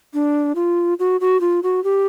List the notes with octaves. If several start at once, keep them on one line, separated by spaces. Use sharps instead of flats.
D4
F4
F#4
F#4
F4
F#4
G4